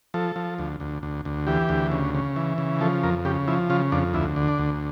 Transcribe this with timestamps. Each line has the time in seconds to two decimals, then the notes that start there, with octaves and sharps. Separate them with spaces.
0.14 F3 A4
0.36 F3
0.58 D2
0.80 D2
1.03 D2
1.25 D2
1.47 E3 G4
1.69 D2
1.92 C#3
2.15 C#3
2.36 E3
2.58 C#3
2.81 F3 A4
3.03 F2 A#4
3.25 C#3 G4
3.48 F3 E4
3.70 C#3 F4
3.92 F2 D4
4.14 D2 E4
4.36 D3
4.48 D4
4.59 D2